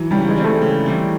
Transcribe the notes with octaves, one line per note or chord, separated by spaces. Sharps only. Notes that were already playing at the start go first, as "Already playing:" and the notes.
Already playing: E3 F#3
C#3 G3
G#3
E3 G3 C4
A3
C#3
E3 G3 C4